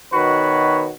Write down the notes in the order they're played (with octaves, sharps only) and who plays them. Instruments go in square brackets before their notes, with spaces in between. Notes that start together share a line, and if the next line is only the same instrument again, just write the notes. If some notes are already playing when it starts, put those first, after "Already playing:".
[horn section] B2 D#3 F#4 B4 C#5